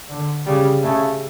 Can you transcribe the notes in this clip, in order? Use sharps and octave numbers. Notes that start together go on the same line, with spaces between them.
D3
C#3 G3
C#3 A3